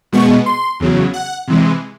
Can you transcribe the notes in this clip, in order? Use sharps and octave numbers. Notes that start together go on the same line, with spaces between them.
B2 G#3 B3 C#6
C6
E2 C#3 F#3
F#5
C3 E3 G#3